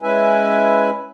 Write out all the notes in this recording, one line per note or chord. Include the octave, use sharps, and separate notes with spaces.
G#3 C#4 E4 B4 E5 G#5